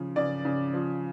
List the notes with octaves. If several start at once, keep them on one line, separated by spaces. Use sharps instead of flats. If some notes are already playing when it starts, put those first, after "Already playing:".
Already playing: C#3 F3
C#3 D5
C#3
F3